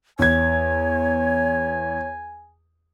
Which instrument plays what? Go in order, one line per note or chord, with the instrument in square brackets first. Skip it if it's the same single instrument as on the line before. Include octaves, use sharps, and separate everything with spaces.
[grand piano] E2 G#6 [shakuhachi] C#5 [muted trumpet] G#5